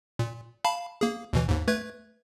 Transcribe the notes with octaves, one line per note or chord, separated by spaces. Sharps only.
A#2
F5 A5 B5
A#3 G#4
D#2 B2 E3
D#2 G#2
A3 B4 G#6